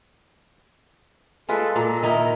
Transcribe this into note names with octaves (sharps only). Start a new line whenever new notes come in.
G#3 F4 A4 B4
A#2 A#5
D#3 D#4 E4